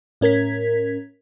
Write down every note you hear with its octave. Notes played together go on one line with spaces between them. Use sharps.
A2 C#4 A#4 G#6 B6